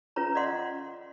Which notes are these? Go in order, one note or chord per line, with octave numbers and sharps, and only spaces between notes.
C#4 F4 B4 C#5 A#5
D5 D#5 F5 F#5 C6